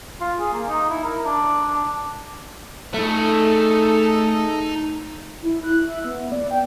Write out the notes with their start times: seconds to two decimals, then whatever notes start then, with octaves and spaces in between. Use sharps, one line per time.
0.21 F4
0.40 G#4
0.53 A#3
0.69 D#4
0.90 E4
1.04 A#4
1.26 D4
1.70 D4
2.94 A3 D#4 G#4 A4 E5
5.43 E4
5.64 F#6
5.87 E5
6.04 B3
6.32 D5
6.51 G5